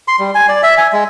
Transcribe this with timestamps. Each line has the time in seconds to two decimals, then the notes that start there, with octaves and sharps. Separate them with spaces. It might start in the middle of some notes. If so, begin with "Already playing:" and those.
0.08 C6
0.19 G3
0.35 G#5
0.48 D5
0.63 E5
0.78 G#5
0.93 G#3